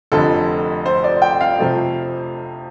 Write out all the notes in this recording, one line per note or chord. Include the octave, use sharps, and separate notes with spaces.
F1 F2 D3 A4
C5
D5
G5
F5
F2 C3 F3 A3